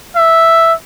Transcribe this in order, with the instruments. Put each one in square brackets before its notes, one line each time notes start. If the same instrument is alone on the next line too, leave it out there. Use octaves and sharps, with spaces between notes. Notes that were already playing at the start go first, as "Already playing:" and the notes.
[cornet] E5